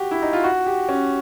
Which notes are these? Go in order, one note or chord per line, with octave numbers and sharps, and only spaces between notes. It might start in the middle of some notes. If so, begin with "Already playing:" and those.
Already playing: F#4 G4
E4
D#4
F4
F#4
G4
C#4